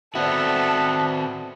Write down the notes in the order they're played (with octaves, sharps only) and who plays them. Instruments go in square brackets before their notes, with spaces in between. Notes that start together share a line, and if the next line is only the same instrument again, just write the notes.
[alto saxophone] B3 [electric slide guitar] C4 F#4 [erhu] A4 [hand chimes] D5 E5